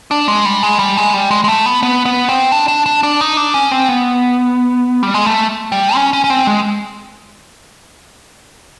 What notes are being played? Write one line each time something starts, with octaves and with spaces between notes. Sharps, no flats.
D4
G#3
G3
G#3
G3
G#3
G3
G#3
G#3
A3
B3
B3
B3
C4
D4
D4
D4
D4
D#4
D4
C#4
C4
B3
G3
G#3
A3
G3
C#4
C#4
C#4
C4
G#3